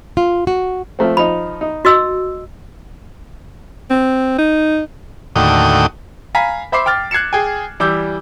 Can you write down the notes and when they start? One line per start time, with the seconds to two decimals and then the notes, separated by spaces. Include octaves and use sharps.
0.17 F4
0.47 F#4
0.99 F3 A3 C4
1.17 F3 D#4 B5
1.61 D#4
1.85 F#4 D#5 E6
3.90 C4
4.38 D#4
5.36 D#2 A2 D3 F#4 G5 D#6
6.35 F5 G#5 A#5 B5 B6
6.72 C5 E5 B5 C6 D6 C7
6.86 G5 D6 F6 A6
7.11 F#6 G#6 C7 C#7 E7
7.33 G#4 G5 G#5
7.80 E3 G3 D6 E6 G6